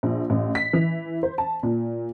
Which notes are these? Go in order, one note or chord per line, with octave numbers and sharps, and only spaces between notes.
A#1
A1
B6
E3
C5
A5
A#2